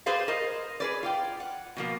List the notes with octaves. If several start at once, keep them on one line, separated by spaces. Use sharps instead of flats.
G4 G#4 B4 C5 D5 F5
A#4 C5 D#5
G#4 B4 D5
F4 D5 G5
F#5
B2 F3 A#3